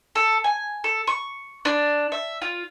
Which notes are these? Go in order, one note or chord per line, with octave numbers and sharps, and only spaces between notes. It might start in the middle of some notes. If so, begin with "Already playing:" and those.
A4
G#5
A4
C#6
D4
E5
F4